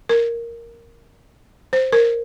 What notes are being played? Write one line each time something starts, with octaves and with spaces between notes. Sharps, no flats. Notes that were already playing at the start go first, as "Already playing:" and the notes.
A#4
C5
A#4